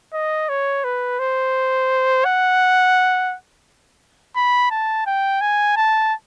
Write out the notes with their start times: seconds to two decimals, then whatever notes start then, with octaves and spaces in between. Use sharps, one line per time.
0.13 D#5
0.49 C#5
0.84 B4
1.19 C5
2.25 F#5
4.36 B5
4.71 A5
5.06 G5
5.41 G#5
5.77 A5